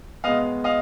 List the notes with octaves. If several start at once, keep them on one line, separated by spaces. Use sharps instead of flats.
B2 G#3 B3 D#5 F5
D#5 F5